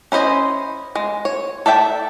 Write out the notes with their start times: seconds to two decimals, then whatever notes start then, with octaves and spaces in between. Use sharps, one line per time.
0.12 C#4 E4 C5 D#5
0.95 G#3
1.25 C#5
1.66 A4 D5 E5 G5